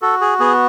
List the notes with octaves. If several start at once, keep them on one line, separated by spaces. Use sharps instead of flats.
F#4 A4
G#4
B3 G#4